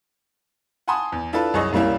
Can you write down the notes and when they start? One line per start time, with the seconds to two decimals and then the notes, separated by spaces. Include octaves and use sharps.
0.88 F#5 G#5 A5 B5 C6 D#6
1.12 E2
1.33 D4 E4 F4 A4 B4
1.54 C2 F#2 G#4 C#5 D#5 C#6
1.73 E1 C2 G3 A#3 C#4 E4